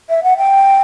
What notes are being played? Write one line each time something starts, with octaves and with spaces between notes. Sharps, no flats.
E5
F#5
G5